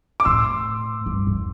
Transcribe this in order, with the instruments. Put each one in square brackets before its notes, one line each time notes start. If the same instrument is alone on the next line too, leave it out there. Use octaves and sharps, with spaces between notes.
[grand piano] D6
[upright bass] A2 [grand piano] C6 E6
[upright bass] G2
F2